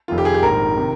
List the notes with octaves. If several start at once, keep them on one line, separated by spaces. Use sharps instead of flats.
F1 F2 D#3 F4
G4
G#4
G4
A#1 G#2 D#3 A#4
C3 D#3